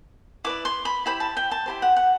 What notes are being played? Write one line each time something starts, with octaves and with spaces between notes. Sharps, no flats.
E4 B4 D5 D6
C6
B5
E4 G4 C5 B5
A5
G5
A5
E4 G4 C5
F#5
F#5